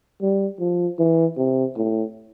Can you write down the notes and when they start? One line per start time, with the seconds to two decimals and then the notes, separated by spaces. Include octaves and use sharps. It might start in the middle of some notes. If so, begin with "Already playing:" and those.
0.22 G3
0.60 F3
0.99 E3
1.37 C3
1.76 A2